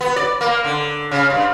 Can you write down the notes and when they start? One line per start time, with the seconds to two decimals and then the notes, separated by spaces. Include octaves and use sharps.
0.01 B3
0.16 D5
0.41 A#3
0.64 D3
1.11 C#3
1.30 G2